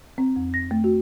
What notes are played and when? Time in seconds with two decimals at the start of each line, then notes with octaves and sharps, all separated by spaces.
0.18 C4
0.36 F2
0.54 A#6
0.71 A3
0.84 F#4